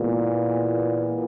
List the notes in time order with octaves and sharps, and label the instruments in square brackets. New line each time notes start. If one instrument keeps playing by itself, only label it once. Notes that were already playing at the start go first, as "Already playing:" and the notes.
Already playing: [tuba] A#2 [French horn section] E3 G#3 B3